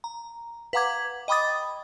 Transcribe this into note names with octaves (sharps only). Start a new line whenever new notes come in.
A#5
B4 F5 F#5 A#5 D6 G#6
D#5 G5 B5 D6 D#6 A6